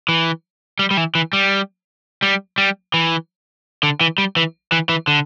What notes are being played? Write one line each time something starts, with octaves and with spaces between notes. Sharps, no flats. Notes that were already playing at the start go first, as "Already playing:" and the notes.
E3
G3
G3
E3
E3
G3
G3
G3
E3
D3
E3
G3
E3
E3
E3
D3